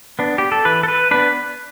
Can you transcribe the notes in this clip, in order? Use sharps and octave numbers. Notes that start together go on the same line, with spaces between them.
B3 D4
G4
A4
E3 B4
A4
B4
B3 D4 B4